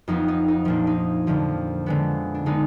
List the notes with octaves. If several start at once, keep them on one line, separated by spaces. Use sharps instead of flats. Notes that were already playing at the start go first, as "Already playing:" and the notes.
F2 F3 B3 D#4
D#4
D#4
A#2 F3 A#3 D4
D#4
F2 D3 F3
D3 G#3 B3
D4
D3 G#3 B3 D#4